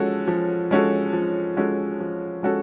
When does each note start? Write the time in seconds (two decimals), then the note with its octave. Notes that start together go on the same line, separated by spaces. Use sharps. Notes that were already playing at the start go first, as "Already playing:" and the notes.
Already playing: F3 G#3 C#4 F#4 A4
0.28 F3
0.71 G#3 C#4 F#4 A4
1.13 F3
1.57 G#3 C#4 F#4 A4
2.00 F3
2.43 G#3 C#4 F#4 A4